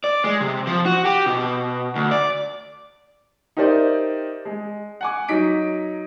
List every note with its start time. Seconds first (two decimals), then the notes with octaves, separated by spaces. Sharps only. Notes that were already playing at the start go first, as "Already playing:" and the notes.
0.04 D5
0.24 G#3
0.41 C3
0.67 F3
0.86 F#4
1.05 G4
1.26 B2
1.95 D2
2.11 D5
3.57 D#4 G4 A#4 C5 D5 E5
4.45 G#3
5.01 F#5 G#5 D6
5.29 F#3 D#4 B6 D7